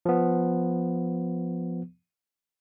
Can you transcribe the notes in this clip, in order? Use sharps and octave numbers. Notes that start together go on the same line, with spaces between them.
F3 B3